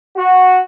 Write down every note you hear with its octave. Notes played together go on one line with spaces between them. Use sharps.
F#4